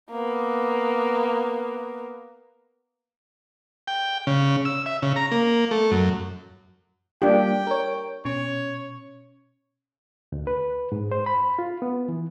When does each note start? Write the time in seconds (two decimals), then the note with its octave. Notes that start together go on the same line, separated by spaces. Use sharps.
0.10 A#3 B3
3.87 G5
4.27 C#3
4.65 E6
4.86 E5
5.02 C#3
5.16 A#5
5.32 A#3
5.71 A3
5.92 F#2
7.22 G3 A#3 D4 F4 G4 G5
7.67 A#4 C#5
8.25 B2 C#4 C#5
10.32 D2
10.47 B4
10.92 G#2
11.12 C5
11.26 B5
11.59 F4
11.82 B3
12.08 E3